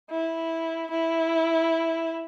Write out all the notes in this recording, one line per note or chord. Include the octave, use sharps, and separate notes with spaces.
E4
E4